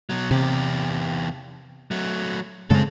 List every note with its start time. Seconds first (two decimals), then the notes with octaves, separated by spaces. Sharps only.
0.10 B2 F#3
0.31 E2 C3 G4
1.91 F#3 A3
2.70 F#2 C#3 G#3 C4 A4